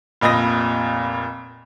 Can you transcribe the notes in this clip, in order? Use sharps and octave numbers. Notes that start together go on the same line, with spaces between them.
F1 A#2 D#5 B5 D#6 A#6